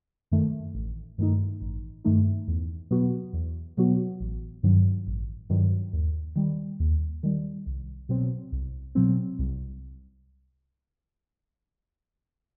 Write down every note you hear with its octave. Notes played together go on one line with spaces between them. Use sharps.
F#2 D#3 A3
A1
G2 D#3 A3 D#4
A1
G2 D#3 A3 D#4
E2
B2 F#3 B3 F#4
E2
B2 F#3 B3 F#4
A1
G2 D#3 F#3
A1
G2 D#3 F#3
D#2
D#3 G3
D#2
D#3 G3
C2
B2 F#3 C4
C2
B2 F#3 C4
C2